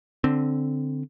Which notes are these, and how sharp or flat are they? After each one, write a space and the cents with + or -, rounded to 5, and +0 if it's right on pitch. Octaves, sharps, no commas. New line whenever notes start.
D3 +0 C4 +0